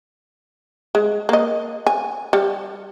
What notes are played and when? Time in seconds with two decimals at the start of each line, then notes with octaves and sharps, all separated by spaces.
0.95 G#3
1.29 A#3 D#5
1.87 G#5
2.33 G3